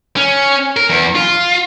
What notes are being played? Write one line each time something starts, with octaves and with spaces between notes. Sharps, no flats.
C#4
A#4
E2
F4